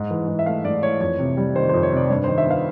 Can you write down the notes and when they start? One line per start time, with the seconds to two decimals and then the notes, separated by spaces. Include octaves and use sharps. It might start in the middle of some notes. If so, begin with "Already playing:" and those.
Already playing: G#2
0.11 E3
0.28 G#2
0.39 E5
0.46 A3 F5
0.65 G#2 D5
0.83 E3 C#5
1.01 F2 C#5
1.19 C3
1.37 G3
1.56 D#3 C5
1.69 C5
1.74 F2
1.83 C#5
1.92 C3 D5
2.10 G2 C#5
2.24 C5
2.28 D#3
2.38 E5
2.46 B3 F5